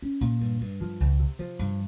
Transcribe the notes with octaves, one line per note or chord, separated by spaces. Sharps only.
C#4
A#2
G2
G2
F3
C#2
C3
F3
G2